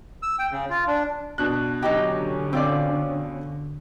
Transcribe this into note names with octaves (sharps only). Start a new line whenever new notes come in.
E6
G5
C#3
F4
D4
B2 D4 F#6
D3 F#3 C#4 D#4 G4
C4 F4 D5